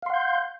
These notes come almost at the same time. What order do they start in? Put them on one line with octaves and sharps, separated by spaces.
F5 C6 F#5 G6